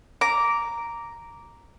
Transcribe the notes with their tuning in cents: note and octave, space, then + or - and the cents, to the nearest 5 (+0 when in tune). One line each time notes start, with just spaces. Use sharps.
A#5 +0 D6 -10